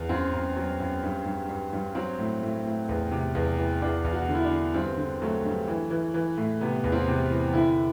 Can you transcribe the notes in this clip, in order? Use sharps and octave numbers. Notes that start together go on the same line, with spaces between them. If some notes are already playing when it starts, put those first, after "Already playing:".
Already playing: E2
F#2 C4
F#2
F#3
F#2
G2
G2
G2
G2
F#3 C4
A2
A2
A2
E2
C3
E2
E3
E2 D4
E2
F#4
D3
E4
D4
D3
G2 C4
D3
F#3 A3
G2
E3
E3
E3
A2
C3 B3
E2
C4
C3
E3
D3 E4